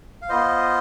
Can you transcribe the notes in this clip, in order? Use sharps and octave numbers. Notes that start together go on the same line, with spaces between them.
F5
B3 F4 C5 D#5